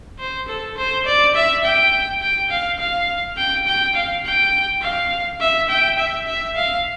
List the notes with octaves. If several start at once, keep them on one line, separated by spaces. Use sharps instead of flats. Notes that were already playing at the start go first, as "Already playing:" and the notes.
C5
A4
C5
D5
E5
G5
G5
F5
F5
G5
G5
F5
G5
F5
E5
G5
E5
E5
F5